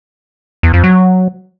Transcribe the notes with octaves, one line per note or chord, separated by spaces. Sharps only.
E2
F2
F#3